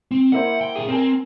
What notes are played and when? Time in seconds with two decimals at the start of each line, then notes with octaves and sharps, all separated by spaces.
0.11 C4
0.32 A#3 E4 C5 F#5
0.61 G5
0.76 A#2 G#4
0.88 C4 A#4 G5 G#5